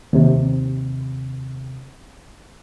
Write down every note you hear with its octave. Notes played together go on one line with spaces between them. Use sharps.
D#2 C3